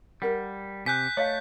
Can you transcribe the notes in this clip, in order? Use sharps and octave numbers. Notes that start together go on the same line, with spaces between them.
G3 G4 A#4 F#5
C3 G#5 F#6 G6 B6
A3 C#5 D#5 F5